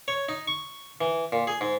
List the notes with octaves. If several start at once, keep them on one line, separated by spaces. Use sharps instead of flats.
C#5
D#4
C#6
E3
A#2
G#4
G#2